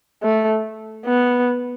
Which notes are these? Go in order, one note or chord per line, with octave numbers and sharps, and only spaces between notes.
A3
B3